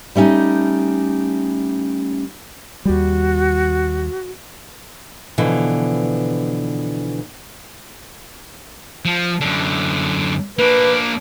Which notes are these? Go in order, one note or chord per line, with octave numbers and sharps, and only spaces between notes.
G3 A3 C#4 D#4
D#2 G3 F#4
B2 D3 E3 F3
F3
F#2 D3
A#3 D4 B4